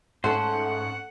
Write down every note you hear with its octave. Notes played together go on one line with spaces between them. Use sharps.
G#2 A3 C#4 C5 F#5